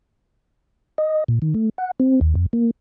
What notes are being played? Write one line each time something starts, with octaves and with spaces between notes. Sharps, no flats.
D#5
A#2
D#3
A3
F#5
C4
D#2
F2
A#3